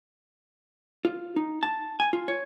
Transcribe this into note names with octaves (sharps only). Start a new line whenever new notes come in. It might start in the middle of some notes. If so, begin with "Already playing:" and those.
F4
D#4
A5
G#5
F4
C#5